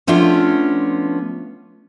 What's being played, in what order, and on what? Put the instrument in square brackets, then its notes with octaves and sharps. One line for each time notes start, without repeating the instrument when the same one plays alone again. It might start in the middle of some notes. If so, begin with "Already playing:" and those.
[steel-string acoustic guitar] F3 A3 B3 C#4 D4 F4